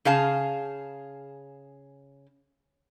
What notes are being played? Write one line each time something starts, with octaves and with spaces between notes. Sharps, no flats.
C#3 G#4 F5 A5